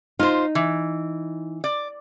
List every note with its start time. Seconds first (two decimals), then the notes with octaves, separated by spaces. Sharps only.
0.19 D#4 F4 C5
0.55 E3
1.64 D5